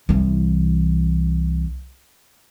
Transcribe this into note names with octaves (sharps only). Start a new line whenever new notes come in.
C2 E3